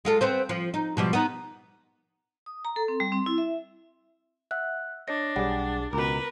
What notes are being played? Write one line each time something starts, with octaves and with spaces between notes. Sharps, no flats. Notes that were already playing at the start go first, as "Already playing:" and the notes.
G#3 F4 A4
B3 C4 C5
F3
D#4
B2 F3 G3
B3 D#4
D#6
A#5
A4
C4
G3
C4
E4
E5
E5 F#5 F#6
D4 C#5 D#5 A#6
B1 G3 G4 G#4 F#5 A6
C#2 B2 A#4 B4 A#5 D6